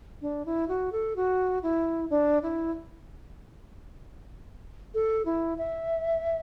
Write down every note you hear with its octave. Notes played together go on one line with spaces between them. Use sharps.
D4
E4
F#4
A4
F#4
E4
D4
E4
A4
E4
E5